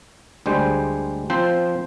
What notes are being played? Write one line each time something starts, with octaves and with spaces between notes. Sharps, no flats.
D2 G3 G#3 C5
F3 C4 C5